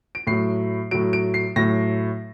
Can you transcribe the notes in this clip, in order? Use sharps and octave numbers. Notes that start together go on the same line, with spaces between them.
D7
A2 F#3 C7
A2 F#3 D7
D7
C7
A2 F#3 A#6